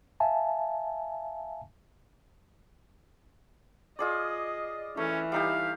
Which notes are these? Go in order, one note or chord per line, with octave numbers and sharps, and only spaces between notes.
E5 F5 G#5 A5
F4 G#4 D5 D#5
E3 A3 C#4
G3 D#4 G4 F5